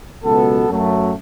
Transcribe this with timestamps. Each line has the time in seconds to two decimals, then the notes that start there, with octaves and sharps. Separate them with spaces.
0.23 C#2 B2 F#3 B3 A4
0.68 F#2 F#3 A3